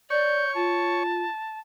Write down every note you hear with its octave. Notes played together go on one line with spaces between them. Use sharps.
C#5 D5 C#6 G6
F4 A5